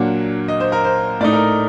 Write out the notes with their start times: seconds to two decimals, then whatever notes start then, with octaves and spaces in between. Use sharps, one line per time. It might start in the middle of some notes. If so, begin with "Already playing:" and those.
Already playing: A#2 F#3 A#3 D4 F#5
0.48 D#5
0.60 C5
0.72 A#4
0.84 C5
1.21 A2 A3 D#4 D5
1.33 A#4